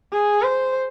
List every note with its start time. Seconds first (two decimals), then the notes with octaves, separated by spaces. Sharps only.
0.13 G#4
0.43 C5